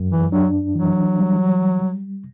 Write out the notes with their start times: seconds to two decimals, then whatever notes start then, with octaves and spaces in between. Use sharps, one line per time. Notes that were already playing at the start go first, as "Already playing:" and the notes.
Already playing: F#2
0.11 E3
0.32 F#3 D4
0.75 E3 F#3
1.19 G3